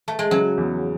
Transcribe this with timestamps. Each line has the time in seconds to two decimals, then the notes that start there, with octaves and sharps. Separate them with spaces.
0.08 A3
0.19 G#3
0.31 C#3 F#3
0.58 E2